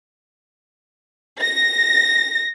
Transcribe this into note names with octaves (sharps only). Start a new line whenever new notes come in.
A#6